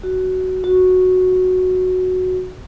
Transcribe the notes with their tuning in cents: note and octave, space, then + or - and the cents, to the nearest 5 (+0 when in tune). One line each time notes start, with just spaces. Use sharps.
F#4 +10
F#4 -5